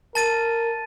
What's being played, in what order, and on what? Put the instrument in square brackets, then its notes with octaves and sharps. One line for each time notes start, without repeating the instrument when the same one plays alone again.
[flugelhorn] A#4 [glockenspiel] A5 A6 D#7